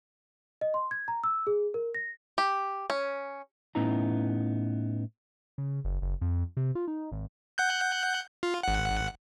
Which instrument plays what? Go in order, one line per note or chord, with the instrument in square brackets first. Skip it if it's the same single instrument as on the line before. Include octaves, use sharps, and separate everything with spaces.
[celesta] D#5
C6
G#6
A#5
E6
G#4
A#4
A#6
[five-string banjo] G4
C#4
[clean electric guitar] A2 B3 C#4 D#4 E4 A#5
[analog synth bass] C#3
F#1
F#1
F2
C3
F4
D#4
G#1
[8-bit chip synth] F#5 F#6 G6
F4
G#1 F#5